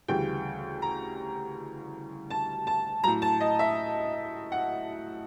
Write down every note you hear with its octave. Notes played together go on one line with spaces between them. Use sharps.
D2 C#3 E3 G3 G5
A#5
A5
A5
A2 F#3 A#5
A5
D#5
E5
F#5